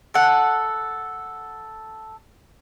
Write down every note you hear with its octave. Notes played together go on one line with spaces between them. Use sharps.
A4 F#5